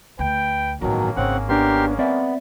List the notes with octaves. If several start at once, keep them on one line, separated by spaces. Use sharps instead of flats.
D2 B4 G5
A1 G2 B2 D#3 F#3 G#3 A#3 C#4
G#1 C#3 C4 F#5
B3 D4 G4 A#4 C6
B3 C4 D5 E5